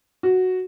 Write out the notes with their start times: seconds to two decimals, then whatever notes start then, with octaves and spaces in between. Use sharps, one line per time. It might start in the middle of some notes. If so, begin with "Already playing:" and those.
0.23 F#4